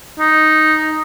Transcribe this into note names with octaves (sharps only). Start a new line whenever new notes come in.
D#4